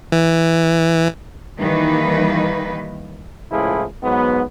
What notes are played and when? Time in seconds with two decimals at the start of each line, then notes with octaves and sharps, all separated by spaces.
0.12 E3
1.58 D#3 E3 G3 A#3 D#4 B4
3.51 C#2 A2 F3 E4 G#4
4.03 G#2 F#3 B3